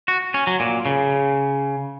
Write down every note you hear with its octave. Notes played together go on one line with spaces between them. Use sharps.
F#4
C#4
F#3
A#2
C#3